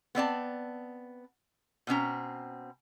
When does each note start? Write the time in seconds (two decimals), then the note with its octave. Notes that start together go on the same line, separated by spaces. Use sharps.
0.15 B3 C4 D5 A5
1.87 B2 C4 C#4 A#5